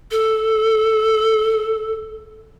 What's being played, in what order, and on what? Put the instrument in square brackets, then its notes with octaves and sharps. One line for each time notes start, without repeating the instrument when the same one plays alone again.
[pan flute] A4